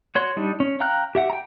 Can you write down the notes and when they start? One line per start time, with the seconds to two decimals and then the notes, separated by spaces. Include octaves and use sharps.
0.15 F#4 C#5 C6
0.37 G3 D4 D#4
0.60 C#4
0.80 F5 G5 A#5 F6 F#6
1.15 G4 E5 F#5
1.30 G5 A#5